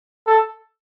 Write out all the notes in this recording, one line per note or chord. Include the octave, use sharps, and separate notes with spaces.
A4